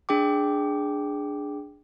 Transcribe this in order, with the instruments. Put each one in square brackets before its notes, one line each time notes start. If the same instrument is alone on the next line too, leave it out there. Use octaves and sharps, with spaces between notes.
[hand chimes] D4 G#4 G5 D6